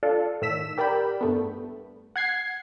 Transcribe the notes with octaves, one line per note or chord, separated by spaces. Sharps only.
D4 F4 A4
A2 D#3 E6 B6 E7
G4 A#4 D5 G5 B5
G2 A3 B3
F#5 G#6 C7